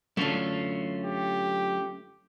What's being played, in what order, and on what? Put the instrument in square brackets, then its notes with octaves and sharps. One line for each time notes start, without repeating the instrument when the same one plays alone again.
[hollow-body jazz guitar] F#2 D3 [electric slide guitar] A3 C#4 F4
[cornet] G4